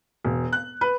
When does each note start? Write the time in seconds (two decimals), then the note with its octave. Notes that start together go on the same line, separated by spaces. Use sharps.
0.25 E1
0.53 F#6
0.81 B4